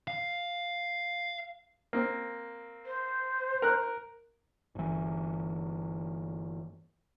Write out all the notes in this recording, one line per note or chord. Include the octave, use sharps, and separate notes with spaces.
F5
A#3 C4
C5
A#4 F#6
G1 E3